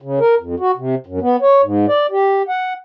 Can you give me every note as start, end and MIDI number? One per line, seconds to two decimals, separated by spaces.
0.02 0.19 49
0.20 0.35 70
0.40 0.55 41
0.60 0.71 66
0.77 0.95 48
1.06 1.19 42
1.21 1.36 59
1.42 1.61 73
1.63 1.86 44
1.88 2.06 74
2.11 2.42 67
2.49 2.73 78